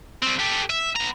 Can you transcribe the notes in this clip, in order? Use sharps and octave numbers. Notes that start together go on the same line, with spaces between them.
G3 C4
G4 A4
E5
B3 A#5